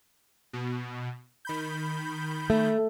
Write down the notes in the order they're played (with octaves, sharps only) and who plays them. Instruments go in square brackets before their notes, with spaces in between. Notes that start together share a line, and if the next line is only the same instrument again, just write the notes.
[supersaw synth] B2
D#3 B5 G6
[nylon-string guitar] A3